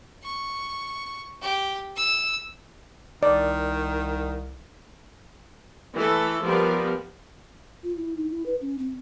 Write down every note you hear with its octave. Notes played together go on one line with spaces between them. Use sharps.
C#6
G4
E6
C2 D#3 D5
E3 A3 A4
F3 G3 B3 A#4
F4
E4
D#4
E4
B4
C#4
C4